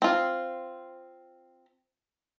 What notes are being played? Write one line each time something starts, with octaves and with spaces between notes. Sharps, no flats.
C4 F4